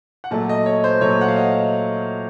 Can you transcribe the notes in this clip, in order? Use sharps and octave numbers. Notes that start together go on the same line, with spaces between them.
F#5
A#2 F#3 A3 A5
D#5
C#5
C5
A#2 F#3 A3 C#5
F#5
F5
D#5